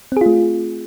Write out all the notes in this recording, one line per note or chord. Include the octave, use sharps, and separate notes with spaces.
A3 C4 F4 G#4